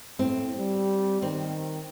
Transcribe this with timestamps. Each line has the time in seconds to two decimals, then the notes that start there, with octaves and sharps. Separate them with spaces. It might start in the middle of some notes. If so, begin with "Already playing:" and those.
0.19 A2 C4
0.58 G3
1.22 D#3 C4